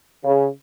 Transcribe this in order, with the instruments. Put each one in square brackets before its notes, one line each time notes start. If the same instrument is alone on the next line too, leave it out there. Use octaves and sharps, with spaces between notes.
[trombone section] C#3